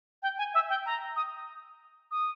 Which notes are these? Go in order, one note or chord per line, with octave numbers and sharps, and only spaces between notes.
G5
G#5
E5
G5
A#5
D#6
D#6